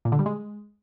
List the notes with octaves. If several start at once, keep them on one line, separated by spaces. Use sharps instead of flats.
A#2
D3
G3
G#3